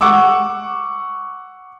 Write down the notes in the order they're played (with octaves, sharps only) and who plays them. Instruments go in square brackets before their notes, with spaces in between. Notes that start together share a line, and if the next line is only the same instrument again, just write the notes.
[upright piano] F#5 C#6 D6 E6